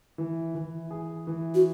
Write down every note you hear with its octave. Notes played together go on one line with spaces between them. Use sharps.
E3
E3
G#4
E3
F#4